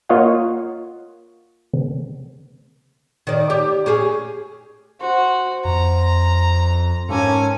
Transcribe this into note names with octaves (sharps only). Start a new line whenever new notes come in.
A#3 F4 C#5 D#5 F5 F#5
D#3 D5
G4
C#4 G4 G#4
F#4 C5
F2 A#5
G#2 A#3 C#4 A4 G#5 A#5